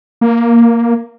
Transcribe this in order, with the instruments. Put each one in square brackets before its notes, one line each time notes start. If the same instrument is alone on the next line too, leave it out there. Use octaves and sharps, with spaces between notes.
[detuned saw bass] A#3